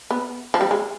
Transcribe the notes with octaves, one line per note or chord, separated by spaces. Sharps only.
B3
F3
G3
G#3